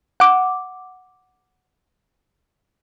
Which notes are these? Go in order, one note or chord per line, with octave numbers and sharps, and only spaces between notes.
F#5 D6